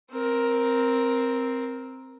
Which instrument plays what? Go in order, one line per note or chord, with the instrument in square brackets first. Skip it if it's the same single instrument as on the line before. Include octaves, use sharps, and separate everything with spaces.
[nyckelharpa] C4 A#4